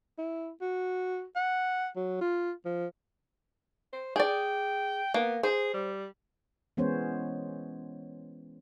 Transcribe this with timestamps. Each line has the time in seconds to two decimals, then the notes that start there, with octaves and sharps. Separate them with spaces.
0.18 E4
0.61 F#4
1.36 F#5
1.96 F#3
2.21 F4
2.65 F3
3.93 C5
4.16 G#4 D5 G5
5.14 A#3 B3
5.43 G#4 C5
5.74 G3
6.77 E3 G#3 B3 C#4 C5 C#5